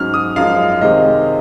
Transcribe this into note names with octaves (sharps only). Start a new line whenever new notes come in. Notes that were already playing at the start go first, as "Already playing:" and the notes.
Already playing: G#2 F#3 C#4 F6
D#6
F#2 F3 G#3 C#4 F5
C3 D#3 G#3 C4 D#5